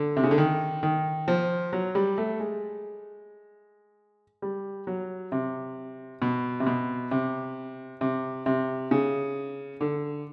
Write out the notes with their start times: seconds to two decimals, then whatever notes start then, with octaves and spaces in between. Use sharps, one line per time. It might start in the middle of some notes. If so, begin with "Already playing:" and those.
Already playing: D3
0.17 C3
0.23 C#3
0.31 D3
0.38 D#3
0.83 D#3
1.28 F3
1.73 F#3
1.95 G3
2.18 A3
2.40 G#3
4.42 G3
4.87 F#3
5.32 C3
6.22 B2
6.60 C3
6.67 B2
7.11 C3
8.01 C3
8.46 C3
8.91 C#3
9.81 D3